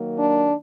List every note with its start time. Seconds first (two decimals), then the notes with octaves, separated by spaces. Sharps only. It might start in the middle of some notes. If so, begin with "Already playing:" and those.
Already playing: D#3 F#3 A#3
0.18 D4